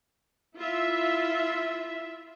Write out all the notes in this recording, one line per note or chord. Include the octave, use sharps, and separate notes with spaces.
E4 F4 E5